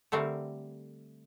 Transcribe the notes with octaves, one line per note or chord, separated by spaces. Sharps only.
D3 G3 A3 C4 A#4